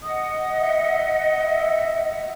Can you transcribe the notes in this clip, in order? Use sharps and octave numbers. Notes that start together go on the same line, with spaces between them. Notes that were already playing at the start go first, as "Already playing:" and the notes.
D#5 F#5 D#6
E5
E5